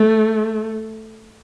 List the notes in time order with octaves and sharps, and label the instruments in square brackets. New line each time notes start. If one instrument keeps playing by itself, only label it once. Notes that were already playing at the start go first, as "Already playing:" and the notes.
Already playing: [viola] A3